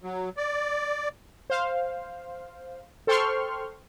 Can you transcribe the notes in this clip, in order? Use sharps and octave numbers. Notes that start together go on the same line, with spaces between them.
F#3
D5
C5 F5
A4 C5 G5 C6 C#6 F6